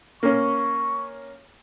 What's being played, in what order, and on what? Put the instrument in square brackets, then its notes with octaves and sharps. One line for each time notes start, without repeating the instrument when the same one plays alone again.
[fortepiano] A#3 C#4 [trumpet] C#6